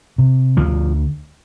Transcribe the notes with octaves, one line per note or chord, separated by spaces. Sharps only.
C3
D2 F3